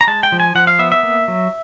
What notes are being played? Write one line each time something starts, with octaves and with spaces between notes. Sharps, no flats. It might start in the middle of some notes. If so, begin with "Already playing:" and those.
A#5
G#3 A5
G5
F3
G#5
F3 F#5
F5
B3 E5
E5
A#3
F#3